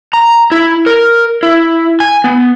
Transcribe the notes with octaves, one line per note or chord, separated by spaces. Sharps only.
A#5
E4
A#4
E4
G#5
B3